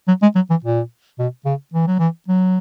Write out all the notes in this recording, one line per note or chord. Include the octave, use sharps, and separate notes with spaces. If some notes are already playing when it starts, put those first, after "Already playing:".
F#3
G#3
F#3
E3
A#2
B2
C#3
E3
F#3
E3
F#3